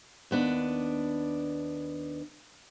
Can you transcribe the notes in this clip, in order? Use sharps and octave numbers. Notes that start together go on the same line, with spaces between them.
D#2 B3 D4